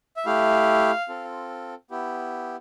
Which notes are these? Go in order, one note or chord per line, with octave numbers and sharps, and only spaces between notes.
E5
A3 E4 G4 F5
C4 F4 A4
B3 E4 G4